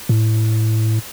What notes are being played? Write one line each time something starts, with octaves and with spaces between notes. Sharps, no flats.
A2